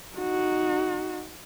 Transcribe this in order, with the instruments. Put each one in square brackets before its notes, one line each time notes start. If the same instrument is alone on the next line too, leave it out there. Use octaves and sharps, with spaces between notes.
[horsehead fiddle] D#4 F#4